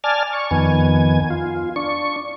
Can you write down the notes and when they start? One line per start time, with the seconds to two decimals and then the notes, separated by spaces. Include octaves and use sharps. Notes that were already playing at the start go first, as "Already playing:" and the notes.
0.04 D5 G#5 A5 F6
0.33 C#6
0.51 F2 D#3 B3 G#5
1.30 F4
1.76 D4 C#6